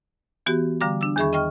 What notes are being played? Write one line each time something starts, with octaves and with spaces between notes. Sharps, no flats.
E3 B3 F#4 G4
D3 G3 F5 A#5 D6
D4 E6
E2 D#3 G#4 E5 B5 C#6
D#5 G5 C#6 F6